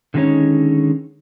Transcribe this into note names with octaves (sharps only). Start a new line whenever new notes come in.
D3 D#3 G#3 C#4 D#4 C#5